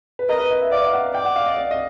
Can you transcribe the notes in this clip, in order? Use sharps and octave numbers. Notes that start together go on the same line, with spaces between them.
B4
A#4 D#5
B4
D#5
E5
D5 F5
F5
F#5
D5 G5
F#5
F5
D#5
D5
D#5